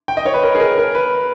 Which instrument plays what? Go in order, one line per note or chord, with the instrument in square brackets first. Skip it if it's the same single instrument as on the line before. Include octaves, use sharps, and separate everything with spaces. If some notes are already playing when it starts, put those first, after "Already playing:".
[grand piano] G5
D#5
C#5
B4
A#4
G#4
A#4
A#4
B4